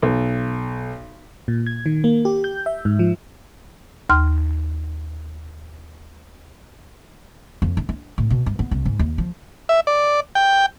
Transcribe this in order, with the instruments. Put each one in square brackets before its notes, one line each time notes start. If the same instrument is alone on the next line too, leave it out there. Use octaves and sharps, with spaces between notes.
[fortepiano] B1
[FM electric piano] A#2
G#6
D#3
A#3
G4
G6
E5
G#2
F3
[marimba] D#2 C6 F6
[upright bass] F2
D4
D4
A2
B2
G2
B3
C2
G#2
D#2
F3
[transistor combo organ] E5
D5
G5